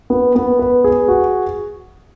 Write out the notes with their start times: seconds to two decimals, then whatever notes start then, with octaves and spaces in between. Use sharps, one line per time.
0.10 B3
0.35 B3
0.59 B4
0.84 G#4
1.08 F#4